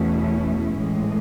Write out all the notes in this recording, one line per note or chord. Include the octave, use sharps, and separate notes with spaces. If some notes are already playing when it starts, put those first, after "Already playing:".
Already playing: E2 B2 A3 C#4 E4
A2 E3 G#3